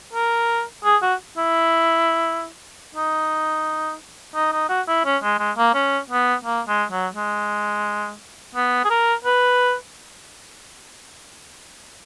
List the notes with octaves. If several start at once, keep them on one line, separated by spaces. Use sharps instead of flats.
A#4
G#4
F#4
E4
D#4
D#4
D#4
F#4
E4
C#4
G#3
G#3
A#3
C#4
B3
A#3
G#3
F#3
G#3
B3
G#4
A#4
B4